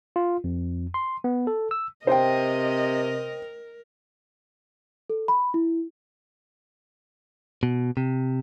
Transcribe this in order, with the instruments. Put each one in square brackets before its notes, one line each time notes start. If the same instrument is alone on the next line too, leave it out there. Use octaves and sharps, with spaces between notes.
[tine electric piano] F4
F2
C6
B3
A4
E6
[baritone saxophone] C3 [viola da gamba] A#4 [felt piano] C5 G5 [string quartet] D#5
[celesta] A4
B5
E4
[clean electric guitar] B2
C3